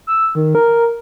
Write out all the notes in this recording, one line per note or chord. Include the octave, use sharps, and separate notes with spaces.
E6
D#3
A#4